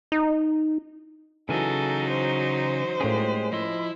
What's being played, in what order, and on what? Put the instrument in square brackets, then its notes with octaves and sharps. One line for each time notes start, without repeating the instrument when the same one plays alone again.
[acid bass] D#4
[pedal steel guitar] C#3 G#5 [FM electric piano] E3 [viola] F#3 D#4 [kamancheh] A4
[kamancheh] C5
[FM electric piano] A2 A#3 C#4 [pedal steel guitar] G#3 G4 G#4
[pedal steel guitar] F3 D#5 C6 [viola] E4